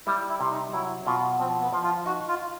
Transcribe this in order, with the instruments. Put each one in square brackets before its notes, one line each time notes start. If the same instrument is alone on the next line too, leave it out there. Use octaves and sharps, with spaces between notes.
[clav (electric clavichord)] G3 [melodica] E4
[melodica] E4
[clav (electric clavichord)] C3
[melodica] D#4
[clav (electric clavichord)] F#3 [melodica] E4
[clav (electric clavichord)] B2 [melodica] F4
[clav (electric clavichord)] F3 [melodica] C4
[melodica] B3
[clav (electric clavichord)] F3
[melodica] F4
[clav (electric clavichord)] D#4 [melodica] F#4
[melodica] F4